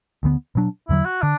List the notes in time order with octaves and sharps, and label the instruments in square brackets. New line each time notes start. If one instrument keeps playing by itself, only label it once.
[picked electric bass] D2 D3 B3
B2 F#3 D4
[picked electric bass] E2 D3 F#3 [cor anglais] E4
[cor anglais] F#4
[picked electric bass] D3 [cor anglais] D4